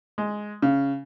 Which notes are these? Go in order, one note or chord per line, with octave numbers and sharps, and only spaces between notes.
G#3
C#3